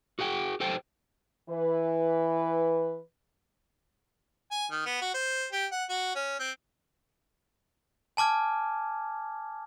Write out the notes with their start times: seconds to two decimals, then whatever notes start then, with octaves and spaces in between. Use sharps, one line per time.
0.19 F#4 G#4 F#5 G5
0.60 G4 A4 C5 G5
1.49 E3 B4
4.51 G#5
4.71 D#3
4.86 B3
5.01 F#4
5.14 C5
5.52 G4
5.72 F#5
5.89 F#4
6.15 C#4
6.39 C4
8.17 G#5 A5 D6 F6 G#6